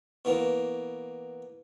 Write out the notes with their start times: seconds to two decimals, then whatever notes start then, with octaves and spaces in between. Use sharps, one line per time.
0.25 B2 E3 A#3